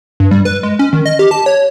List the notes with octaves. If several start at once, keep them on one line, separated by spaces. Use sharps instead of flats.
G2
G3
B4
G#3
C#4
D#3
D#5
G4
A5
C#5